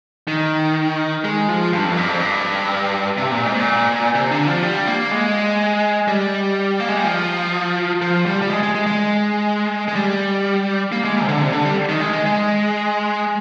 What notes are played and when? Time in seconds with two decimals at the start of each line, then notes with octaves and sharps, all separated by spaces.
0.28 D#3
1.24 G#3
1.49 F3
1.73 G2
1.85 F2
1.97 G2
2.09 F2
2.21 G2
3.17 C3
3.31 A#2
3.46 G#2
3.60 A#2
4.15 C3
4.31 D3
4.47 F3
4.63 G3
4.87 A#3
5.11 G#3
6.08 G3
6.80 A#3
6.89 G#3
6.97 G3
7.05 F3
8.02 F3
8.26 G3
8.42 G3
8.50 G#3
8.63 G#3
8.75 G#3
8.86 G#3
9.88 G#3
9.95 G3
10.92 A#3
11.04 G#3
11.16 G3
11.23 C3
11.28 D3
11.41 C3
11.52 D3
11.65 G3
11.89 D#3
12.01 G#3
12.13 G#3
12.26 G#3